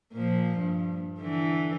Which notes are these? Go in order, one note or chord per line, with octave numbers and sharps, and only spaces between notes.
A#2 F3
G2
D3 E3